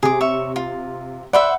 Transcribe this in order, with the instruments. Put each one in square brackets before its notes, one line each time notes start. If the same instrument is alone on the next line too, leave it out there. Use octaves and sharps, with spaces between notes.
[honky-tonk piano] C3 [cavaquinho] G#4 D6
[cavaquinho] C#5 E5 C#6
F4
[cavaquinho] B4 C5 E5 [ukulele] D5 [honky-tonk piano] F#5